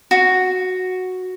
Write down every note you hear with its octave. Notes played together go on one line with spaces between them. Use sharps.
F#4